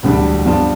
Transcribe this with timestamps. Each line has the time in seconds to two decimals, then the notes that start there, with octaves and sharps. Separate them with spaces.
0.03 E1 D2 D3 G3 D4
0.45 G2 F3 B3 D4 F4